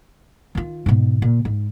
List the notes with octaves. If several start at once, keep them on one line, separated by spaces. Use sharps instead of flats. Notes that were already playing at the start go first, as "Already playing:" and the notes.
D#3 F4
G#2 B2
A#2
G#2